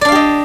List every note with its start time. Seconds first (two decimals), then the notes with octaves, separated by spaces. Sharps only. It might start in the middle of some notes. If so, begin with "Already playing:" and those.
0.01 D5
0.05 D4
0.08 F5
0.12 G4
0.15 D#5